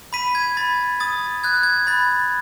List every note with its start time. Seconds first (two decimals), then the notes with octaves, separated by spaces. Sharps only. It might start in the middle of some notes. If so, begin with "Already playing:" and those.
0.13 B5 B6 D#7
0.35 G#6
0.57 B5 A6
1.00 D#6 A6
1.44 F#6 G#6
1.63 G#6
1.87 B5 A6